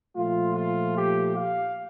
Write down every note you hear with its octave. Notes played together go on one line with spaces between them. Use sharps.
A#2 F3 A3 F4
F4
G4
F5